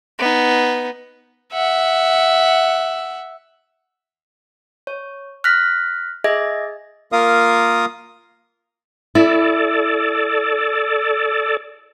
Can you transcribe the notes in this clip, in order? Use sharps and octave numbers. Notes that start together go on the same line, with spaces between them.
B3 D#4
E5 F#5
C#5
F6 F#6 A#6 B6
G#4 D#5 E5 G#6 A#6
A#3 F4 A#4 F5 D#6
E4 A4 D5